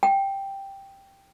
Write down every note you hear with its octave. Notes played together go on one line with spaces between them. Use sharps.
G5